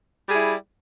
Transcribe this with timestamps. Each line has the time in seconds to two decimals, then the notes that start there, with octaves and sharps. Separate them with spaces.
0.28 G3
0.31 G#4
0.34 E4